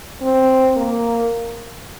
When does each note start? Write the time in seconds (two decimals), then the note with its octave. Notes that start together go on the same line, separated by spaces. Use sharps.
0.22 C4
0.77 A#3